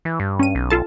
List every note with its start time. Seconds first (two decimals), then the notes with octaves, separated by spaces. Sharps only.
0.05 E3
0.20 G2
0.39 C#4 D#7
0.55 B1
0.70 F4 A4 A5